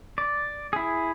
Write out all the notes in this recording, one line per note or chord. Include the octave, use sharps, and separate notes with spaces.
D5
E4 G#4